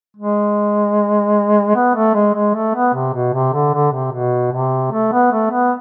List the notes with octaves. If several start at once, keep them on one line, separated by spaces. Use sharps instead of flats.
G#3
B3
A3
G#3
G#3
A3
B3
C3
B2
C3
D3
D3
C3
B2
C3
A3
B3
A3
B3